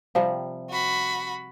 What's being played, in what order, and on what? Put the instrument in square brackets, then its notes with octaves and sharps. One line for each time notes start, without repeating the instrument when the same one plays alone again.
[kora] C3 F3 G3 [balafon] F5
[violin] F#4 B5